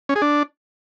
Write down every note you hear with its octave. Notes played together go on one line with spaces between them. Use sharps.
C#4
G#4
D4